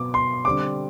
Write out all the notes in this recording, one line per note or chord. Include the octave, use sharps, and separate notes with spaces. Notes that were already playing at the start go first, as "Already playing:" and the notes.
Already playing: B2 F#3 B3 D6
C6
D3 G3 C4 D6